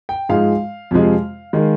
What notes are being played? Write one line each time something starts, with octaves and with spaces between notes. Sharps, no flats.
G5
G#2 F3 G#3 F5
F2 C3 F3 G#3
D#3 G#3